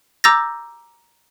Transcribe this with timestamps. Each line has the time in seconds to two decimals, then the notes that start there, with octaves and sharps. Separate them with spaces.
0.24 A#5 D6 E6 G6 A6 A#6